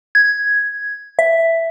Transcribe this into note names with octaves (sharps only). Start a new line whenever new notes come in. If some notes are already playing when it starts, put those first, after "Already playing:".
G#6
E5